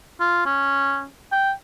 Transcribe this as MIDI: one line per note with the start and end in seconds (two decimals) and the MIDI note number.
0.20 0.44 65
0.46 1.05 61
1.32 1.52 79